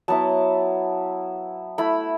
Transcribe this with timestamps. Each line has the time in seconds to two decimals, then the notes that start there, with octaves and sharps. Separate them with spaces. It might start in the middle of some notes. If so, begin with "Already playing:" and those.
0.08 F#3 B3 E4 A5
1.78 A3 E4 B5